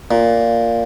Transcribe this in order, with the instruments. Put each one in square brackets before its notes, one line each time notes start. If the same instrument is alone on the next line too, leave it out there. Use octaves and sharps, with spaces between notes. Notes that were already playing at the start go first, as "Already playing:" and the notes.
[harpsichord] A#2